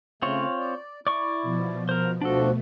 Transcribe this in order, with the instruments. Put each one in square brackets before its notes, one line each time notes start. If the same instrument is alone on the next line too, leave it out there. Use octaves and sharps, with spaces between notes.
[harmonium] C#3 A3 [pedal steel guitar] C4 F4 C#5
[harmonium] D5
[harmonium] E4 [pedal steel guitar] D5 C#6
[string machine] B2 F3
[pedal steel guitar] A#4 C5
[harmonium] D2 F3 F#4 [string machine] B2 A3 [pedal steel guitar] D4 A4